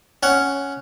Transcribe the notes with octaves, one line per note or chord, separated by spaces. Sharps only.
C#4 F#5